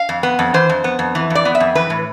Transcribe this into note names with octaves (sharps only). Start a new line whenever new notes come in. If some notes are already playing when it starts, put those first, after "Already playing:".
Already playing: F5
F2
B3
F2
E3 C5
F2
B3
F2
E3
F2
D5
B3
E5
F2
E3 B4
A2